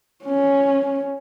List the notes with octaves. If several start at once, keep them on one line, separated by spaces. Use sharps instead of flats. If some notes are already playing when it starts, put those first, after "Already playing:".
C#4